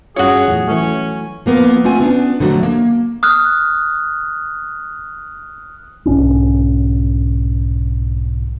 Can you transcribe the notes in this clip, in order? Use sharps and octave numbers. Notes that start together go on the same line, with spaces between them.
G2 C#4 F4 F#4 G#4 C#5
E2 A2 F#3
E3 F#3 A3 C#4
F3 A#3 B3
A3 C4 F4 F#5 G#5
B3 C#4 D4
D3 F3 F#3 A3
A#3
D#6 F6 F#6
B1 G#2 C#4 D4